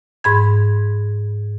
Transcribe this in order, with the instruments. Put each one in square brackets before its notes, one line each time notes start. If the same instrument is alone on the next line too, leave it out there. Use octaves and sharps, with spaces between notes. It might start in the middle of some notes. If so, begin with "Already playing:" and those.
[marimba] G#2 B5 G#6